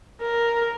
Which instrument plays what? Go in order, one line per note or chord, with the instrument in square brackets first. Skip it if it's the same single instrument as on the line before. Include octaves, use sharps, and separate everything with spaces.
[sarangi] A#4